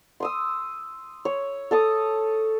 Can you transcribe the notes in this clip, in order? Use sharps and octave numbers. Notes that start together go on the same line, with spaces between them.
C6 D#6 E6
C#5
A4 A5 D#6